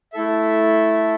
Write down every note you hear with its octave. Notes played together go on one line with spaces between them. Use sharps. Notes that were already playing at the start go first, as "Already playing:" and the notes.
A3 E4 A4 E5